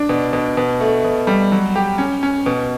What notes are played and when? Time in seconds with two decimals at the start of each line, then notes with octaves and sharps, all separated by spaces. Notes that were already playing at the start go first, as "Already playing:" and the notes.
Already playing: D4
0.09 B2
0.33 B2
0.57 B2
0.80 A3
1.04 B2
1.27 G3
1.52 F#3
1.75 G4
1.98 C#4
2.23 C#4
2.46 B2